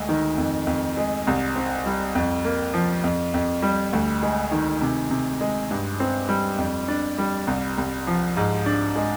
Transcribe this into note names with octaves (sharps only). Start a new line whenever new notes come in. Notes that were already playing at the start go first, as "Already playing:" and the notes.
Already playing: D2 G#3
D#3
F2
F2
G#3
C2
C4
G3
F2
A#3
F3
F2
F2
G3
D2
G#3
D#3
C3
C3
G#3
G2
C4
G3
F2
D4
G3
C2
C2
F3
G#2
D4
G#3